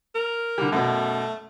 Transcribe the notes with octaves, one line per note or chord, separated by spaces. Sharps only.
A#4
D3 G3
F#2 B2 A3